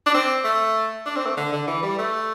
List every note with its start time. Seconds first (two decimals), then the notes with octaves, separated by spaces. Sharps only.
0.07 D4
0.14 C4
0.44 A3
1.06 D4
1.16 C4
1.26 A3
1.37 D3
1.52 D3
1.67 E3
1.83 G3
1.98 A3